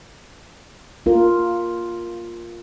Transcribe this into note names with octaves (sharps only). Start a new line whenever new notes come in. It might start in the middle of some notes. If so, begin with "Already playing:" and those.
A#3 F4 A#4